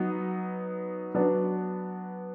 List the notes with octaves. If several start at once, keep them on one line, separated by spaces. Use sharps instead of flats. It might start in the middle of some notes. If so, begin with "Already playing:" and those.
Already playing: F#3 B3 D#4
F#3 B3 D4